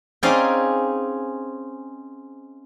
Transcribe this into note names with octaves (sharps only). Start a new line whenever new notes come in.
C4 C#4 D#4 G#4 D5 F5